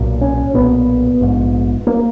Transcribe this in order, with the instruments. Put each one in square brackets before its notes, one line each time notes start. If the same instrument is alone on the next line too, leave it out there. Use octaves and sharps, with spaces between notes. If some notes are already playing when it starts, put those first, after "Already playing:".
Already playing: [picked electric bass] B1 A#2
C#4
B1 A#2 B3
A#1 G#2
A#3